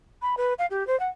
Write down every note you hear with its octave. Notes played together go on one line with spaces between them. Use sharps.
B5
B4
F5
G4
C5
F#5